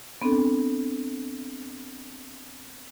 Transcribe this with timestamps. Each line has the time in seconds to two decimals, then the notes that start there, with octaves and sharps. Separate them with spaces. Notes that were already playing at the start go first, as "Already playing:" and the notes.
0.21 B3 C4 D4 A4